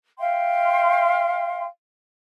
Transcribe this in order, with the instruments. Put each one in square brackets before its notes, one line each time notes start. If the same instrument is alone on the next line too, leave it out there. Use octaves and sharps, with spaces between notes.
[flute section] E5 F5 G5 C6